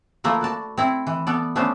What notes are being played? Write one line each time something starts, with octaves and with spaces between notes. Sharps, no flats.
F3 A3 A#3 E4
F#4 D5 A5
C4 E4
E3
B3 A4 D5
A3 B3 C#4 D4 C5